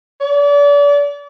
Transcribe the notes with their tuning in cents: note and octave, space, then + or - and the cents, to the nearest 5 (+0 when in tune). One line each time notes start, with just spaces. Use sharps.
D5 -35